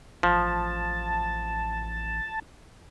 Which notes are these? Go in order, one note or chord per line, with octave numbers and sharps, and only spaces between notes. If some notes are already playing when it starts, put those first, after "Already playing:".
A1 F3 A5